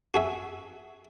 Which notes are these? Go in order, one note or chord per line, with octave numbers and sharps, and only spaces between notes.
F#4 G#4 E5